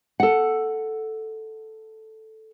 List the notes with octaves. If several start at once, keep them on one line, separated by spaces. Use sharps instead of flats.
A4 F#5